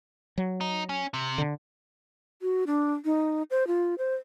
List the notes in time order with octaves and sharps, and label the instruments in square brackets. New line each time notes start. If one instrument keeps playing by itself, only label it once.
[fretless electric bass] F#3
[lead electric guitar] D#4
C#4
C3
[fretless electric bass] D3
[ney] F#4
D4
D#4
C5
F4
C5